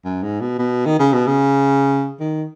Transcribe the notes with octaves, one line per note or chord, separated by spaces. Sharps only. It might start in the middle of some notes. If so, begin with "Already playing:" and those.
F#2
G#2
B2
B2
D#3
C#3
B2
C#3
D#3